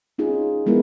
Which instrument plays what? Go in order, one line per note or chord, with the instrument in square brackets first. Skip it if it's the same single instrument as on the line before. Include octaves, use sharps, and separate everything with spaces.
[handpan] C#4 D#4 F4 G#4
F3 G#3 B3 E4 A#4